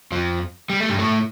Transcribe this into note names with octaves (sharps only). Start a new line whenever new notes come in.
F2 F3
G3
A3
G2 G3
A2 A3